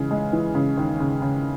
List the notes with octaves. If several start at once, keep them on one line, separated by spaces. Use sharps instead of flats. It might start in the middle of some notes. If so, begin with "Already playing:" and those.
Already playing: C#3 E3 G#3
G#3
E3
C#3
D#2
C#3
C#3